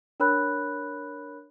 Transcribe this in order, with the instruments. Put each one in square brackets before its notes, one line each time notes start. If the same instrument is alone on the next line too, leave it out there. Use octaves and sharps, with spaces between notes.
[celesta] D4 A#4 C#5 B5 F#6